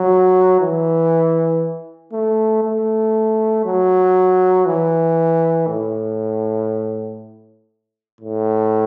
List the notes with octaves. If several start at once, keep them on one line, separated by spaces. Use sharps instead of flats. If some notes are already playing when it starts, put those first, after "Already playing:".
Already playing: F#3
E3
A3
A3
F#3
E3
A2
A2